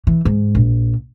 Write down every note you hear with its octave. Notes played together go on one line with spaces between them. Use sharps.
E3
G#2
A#1